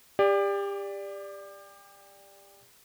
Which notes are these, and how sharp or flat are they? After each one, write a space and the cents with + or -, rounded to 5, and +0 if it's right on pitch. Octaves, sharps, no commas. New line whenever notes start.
G4 +30 D5 +0